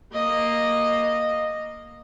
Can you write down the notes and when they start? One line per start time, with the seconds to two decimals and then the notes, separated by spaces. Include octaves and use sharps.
0.13 A#3 D#5